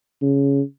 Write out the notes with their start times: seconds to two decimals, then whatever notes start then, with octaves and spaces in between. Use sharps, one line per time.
0.22 C#3